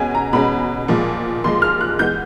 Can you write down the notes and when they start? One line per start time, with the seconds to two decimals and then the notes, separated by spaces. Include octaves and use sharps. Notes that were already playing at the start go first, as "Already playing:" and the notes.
Already playing: B2 G#3 C#4 G#5
0.15 A#5
0.33 B2 G#3 C#4 B5
0.88 A#2 F3 G#3
1.44 A#2 F3 G#3 C6
1.62 F6
1.81 F#6
1.99 E3 G#3 B3 G6